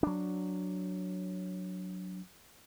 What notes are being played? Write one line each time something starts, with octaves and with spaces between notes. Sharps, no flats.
F#3 D4